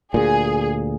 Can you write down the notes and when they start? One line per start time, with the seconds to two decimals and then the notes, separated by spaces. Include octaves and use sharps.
0.14 D2 A#2 G#4